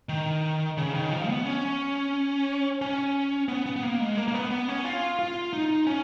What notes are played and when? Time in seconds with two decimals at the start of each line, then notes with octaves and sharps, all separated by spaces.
0.09 D#3
0.77 C#3
0.94 D#3
1.11 F3
1.28 B3
1.45 C#4
2.82 C#4
3.49 B3
3.66 B3
3.76 B3
3.83 A#3
4.00 G#3
4.17 A#3
4.28 A#3
4.34 B3
4.51 B3
4.68 C#4
4.85 F4
5.19 F4
5.53 D#4
5.87 C#4